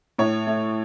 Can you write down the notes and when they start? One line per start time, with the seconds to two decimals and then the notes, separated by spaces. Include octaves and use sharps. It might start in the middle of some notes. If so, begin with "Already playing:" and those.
0.18 A2 C#5
0.47 A3